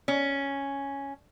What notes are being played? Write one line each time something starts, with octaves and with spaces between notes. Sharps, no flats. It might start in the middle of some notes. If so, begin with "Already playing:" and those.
C#4